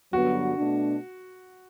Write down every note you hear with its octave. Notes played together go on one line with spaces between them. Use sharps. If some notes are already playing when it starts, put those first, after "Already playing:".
G2 D3 F#3 B3 F#4
B2 A3 D4